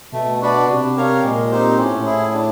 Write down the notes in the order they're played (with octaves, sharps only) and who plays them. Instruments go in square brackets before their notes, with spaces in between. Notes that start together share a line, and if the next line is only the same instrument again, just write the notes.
[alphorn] B2 [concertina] A3
[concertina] D4 F#4 B4 D5
[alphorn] C3 [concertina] D4
[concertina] G4 A#4 C#5 F5
[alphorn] A#2 [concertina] G#3
[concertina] C4 D#4 G4 C5
[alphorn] A2 [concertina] C#4
[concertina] E4 G#4
D4